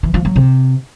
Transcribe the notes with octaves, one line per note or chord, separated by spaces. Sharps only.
E3
F3
F#3
C3